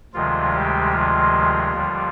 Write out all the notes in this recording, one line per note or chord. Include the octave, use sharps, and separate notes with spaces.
D2 C3 D#3 F3 G#3 F4
G3 G4
F3 F4
D#2 D3 G3